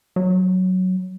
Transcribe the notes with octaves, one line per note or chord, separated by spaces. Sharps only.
F#3